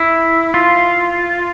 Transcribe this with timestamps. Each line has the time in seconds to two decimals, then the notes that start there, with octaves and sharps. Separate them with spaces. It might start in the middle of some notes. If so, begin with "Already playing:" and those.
Already playing: E4
0.54 F4